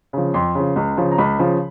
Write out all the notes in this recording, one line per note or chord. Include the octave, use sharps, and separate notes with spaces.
C#3 F3
F2 C6
C#3 F3
C#2
C#3 F3
A#5
C#2 B5
C#3 F3